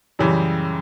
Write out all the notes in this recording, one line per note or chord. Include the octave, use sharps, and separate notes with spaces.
F#2 C#3 E3 G3